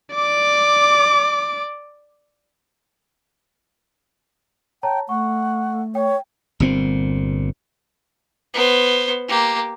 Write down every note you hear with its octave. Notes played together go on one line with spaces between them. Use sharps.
D5 D6
C#5 G5 A5 A#5
A3 F#5 C#6
C#5 G5
G1 A#2 C4
B3 C5
A#3 G4